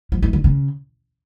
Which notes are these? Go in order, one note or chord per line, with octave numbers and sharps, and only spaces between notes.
F3
E3
D3
C#3